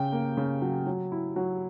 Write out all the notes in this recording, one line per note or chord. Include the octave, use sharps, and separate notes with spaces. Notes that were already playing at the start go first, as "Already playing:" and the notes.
Already playing: C#3 G5
A#3
C#3
F#3
F#3
E4
F#3